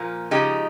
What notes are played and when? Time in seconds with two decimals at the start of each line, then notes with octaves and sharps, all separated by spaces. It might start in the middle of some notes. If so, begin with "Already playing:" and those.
Already playing: A#2 F3 A#3
0.31 C#3 F3 G#3 D#4 G4